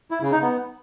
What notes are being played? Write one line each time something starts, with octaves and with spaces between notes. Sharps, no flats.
E4
C#3
D#4
B3